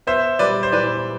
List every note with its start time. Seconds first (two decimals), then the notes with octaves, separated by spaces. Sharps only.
0.07 B3 C5 E5
0.39 G3 B4 D5
0.63 C5
0.72 E3 B4 D5